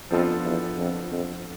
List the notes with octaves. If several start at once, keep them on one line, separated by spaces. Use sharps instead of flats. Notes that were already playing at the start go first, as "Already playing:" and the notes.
F2 F3 B3 D4 F4 A4
E2
F2
F2